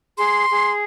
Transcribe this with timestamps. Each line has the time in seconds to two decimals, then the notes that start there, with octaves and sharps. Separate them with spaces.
0.17 G#4 C6
0.49 G#4